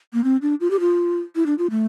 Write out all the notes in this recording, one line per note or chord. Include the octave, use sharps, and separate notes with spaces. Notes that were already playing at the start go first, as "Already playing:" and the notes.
A#3
C4
D4
F4
G4
F4
E4
D4
F4
A3